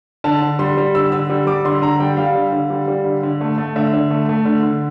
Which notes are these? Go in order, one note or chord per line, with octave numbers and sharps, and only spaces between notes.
D3 A5
D3
G3 C6
G3
D3 E6
D3 E6
G3
G3 D6
D3 C6
D3 A#5
G3 G5
G3 F5
D3
D3
G3
G3
D3
D3
A3
A3
D3 E5
D3
A3
A3
D3
D3